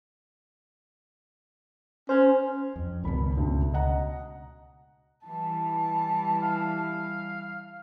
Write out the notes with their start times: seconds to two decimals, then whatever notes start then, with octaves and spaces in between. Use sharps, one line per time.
2.09 C#4 C5
2.76 F2
3.04 G#1 C#2 B2 B5
3.37 D2 C#3
3.74 D#5 F#5 A#5
5.24 E3 G3 A5
6.43 F5